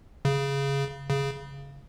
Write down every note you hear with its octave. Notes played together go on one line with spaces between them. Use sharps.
C#3
C#3